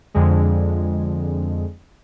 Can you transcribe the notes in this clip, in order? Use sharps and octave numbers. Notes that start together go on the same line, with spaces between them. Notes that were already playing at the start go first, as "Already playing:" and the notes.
F2 D3 G#3